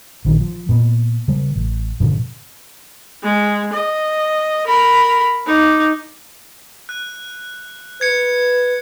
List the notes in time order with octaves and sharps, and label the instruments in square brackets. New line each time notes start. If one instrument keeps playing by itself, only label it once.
[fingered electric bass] A#1 D#3
F3
A#2 B3
C#3 G3
A1
G#2 B2 D3 F3
[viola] G#3
D#5
A#4 B5
D#4 D6
[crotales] F#6
[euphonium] B4 [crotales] G#6 C#7